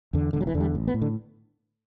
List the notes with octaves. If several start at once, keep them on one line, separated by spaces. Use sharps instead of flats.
E2 D3
E1 D3
F#3
E3
E2 D3
G3
A1
B3
A2
D3